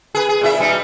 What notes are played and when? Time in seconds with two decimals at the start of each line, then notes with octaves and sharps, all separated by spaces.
0.15 G#4 A#4 B4
0.29 G#4
0.41 A#2 E4 E5
0.58 B2 G3 D#4